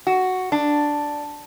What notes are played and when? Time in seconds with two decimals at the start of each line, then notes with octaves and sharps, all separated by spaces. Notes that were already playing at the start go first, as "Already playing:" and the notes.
0.07 F#4
0.52 D4